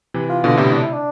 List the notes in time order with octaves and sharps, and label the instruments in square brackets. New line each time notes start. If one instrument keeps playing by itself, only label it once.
[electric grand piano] C3 E3
[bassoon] F4
[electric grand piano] B2 D3 [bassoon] F4
[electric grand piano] A2 C3 [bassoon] E4
[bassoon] D4
E4
D4